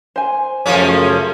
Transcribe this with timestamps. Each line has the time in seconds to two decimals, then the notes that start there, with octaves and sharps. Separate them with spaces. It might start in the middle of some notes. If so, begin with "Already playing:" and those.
0.16 C5 G#5
0.66 F#2 C#3 F3 A3 A#3 C#4